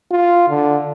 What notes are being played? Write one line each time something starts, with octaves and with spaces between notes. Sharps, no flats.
F4
D3